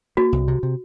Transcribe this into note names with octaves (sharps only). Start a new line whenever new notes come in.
A#3 F#4
C2
C3
C3